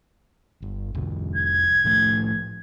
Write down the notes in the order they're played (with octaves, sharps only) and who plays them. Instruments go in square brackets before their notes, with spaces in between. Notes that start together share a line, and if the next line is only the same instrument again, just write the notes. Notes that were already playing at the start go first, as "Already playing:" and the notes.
[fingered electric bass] G1
F1 C2
[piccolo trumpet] G#6
[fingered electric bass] A2 F3 A3